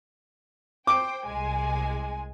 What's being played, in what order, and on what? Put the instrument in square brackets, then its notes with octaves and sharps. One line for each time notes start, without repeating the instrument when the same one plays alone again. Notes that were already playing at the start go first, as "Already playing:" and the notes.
[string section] C5 G5 [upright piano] D6 D7
[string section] C2 G#3 G#5